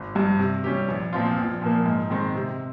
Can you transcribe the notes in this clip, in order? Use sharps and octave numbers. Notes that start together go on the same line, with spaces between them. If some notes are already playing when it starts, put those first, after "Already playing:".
Already playing: G#1
G2 G3
C3
G3 C#4 G4
A#1
A#2 F3 C4 F4
A#1
A#2 F3 A#3
G#2
D#3 G#3 C4
C3